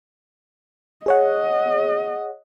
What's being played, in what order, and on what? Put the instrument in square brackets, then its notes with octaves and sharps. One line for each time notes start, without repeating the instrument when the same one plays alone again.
[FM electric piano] G#4 C#5 F#5 [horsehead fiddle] D#5